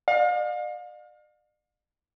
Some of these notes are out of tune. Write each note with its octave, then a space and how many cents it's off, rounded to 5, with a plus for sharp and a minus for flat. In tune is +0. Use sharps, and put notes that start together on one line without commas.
D5 +45 F5 +35